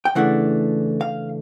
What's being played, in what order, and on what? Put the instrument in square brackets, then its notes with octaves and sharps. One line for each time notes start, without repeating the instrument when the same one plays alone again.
[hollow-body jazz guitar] G5
C#3 E3 A3 D4 F#5
F5